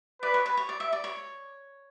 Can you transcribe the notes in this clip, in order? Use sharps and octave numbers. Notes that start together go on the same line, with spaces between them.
B4 D5
C#5
B4
C#5
D5
E5
D5
C#5